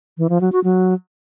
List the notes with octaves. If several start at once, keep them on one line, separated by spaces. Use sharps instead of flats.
E3
F3
F#3
F#4
F#3